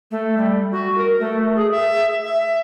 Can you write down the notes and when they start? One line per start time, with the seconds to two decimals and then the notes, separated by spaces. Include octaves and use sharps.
0.11 A3
0.37 G3
0.71 F#4
0.98 A#4
1.19 A3
1.55 G#4
1.71 E5
2.24 E5